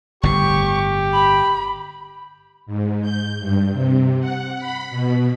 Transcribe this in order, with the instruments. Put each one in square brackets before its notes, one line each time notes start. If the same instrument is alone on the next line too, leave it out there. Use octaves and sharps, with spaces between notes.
[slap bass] G1 A2 [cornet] G4 [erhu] C#6
[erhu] B5
[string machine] G#2
G6
G2
C3
F#5
B5
B2